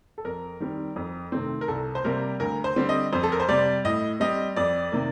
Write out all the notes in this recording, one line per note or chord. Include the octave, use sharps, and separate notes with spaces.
A4
F2 A#4
D#3 G3 C4
F2
C3 D#3 A3 C4
A#4
C2 A4
C5
C3 G3 A#3 A#4
D2 A#4
C5
D3 G3 C4
D#5
F2 C5
A4
A#4
C5
C3 G3 D5
A2 D#5
G3 C4 D#5
F2 D5
C3 D#3 A#3